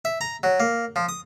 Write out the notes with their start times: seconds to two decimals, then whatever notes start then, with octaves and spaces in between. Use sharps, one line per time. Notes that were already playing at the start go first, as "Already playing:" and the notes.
0.05 E5
0.21 A#5
0.43 F#3
0.60 A#3
0.96 F3
1.09 D#6